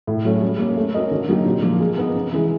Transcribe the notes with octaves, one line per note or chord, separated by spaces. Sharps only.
A2
F#3 A3 C#4
G3
A#3 C#4
A3
C#4 F#4 A#4 D#5
D3
F#3 A#3 D#4 G4
A#2
F3 A#3
G#3
B3 D#4
C#3
E3 G#3